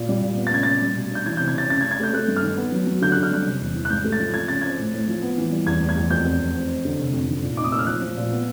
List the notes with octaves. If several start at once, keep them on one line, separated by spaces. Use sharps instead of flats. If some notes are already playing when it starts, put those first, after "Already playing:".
Already playing: A#2
G3
A#2
B3
A6
C#3 G#6
C#3 A6
G3
B2
D4 G6
E3 G#6
G6
C3
G#6
C3 A6
C#3 A6
G#6
C#3
G#6
A3 G6
A3 F#6
G2
F6
D#3
B3
F#3
F#3
D3 G6
D3 F#6
F6
G3 F#6
C3
E2
E3
F#6
G#2 G6
A3
A6
F3
F3 G#6
C#3 A6
C4 G#6
A2
A2
F3
B3
E3
G3
E2 G#6
E2
G#6
E2
F2 G6
F2
F2
C4
C4
D3
C3
F2
D#3
A#2
D#4 D6
D#6
A#3 E6
F6
F3 F#6
F3
A#2
B3